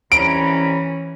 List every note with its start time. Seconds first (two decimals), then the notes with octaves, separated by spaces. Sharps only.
0.12 C2 E3 C#4 A#5 B5 D7